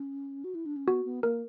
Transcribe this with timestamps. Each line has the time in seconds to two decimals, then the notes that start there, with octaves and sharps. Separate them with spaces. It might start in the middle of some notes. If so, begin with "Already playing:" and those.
Already playing: C#4
0.44 F#4
0.55 E4
0.66 D4
0.76 C#4
0.87 B3 F#4
1.05 B3
1.23 A#3 A#4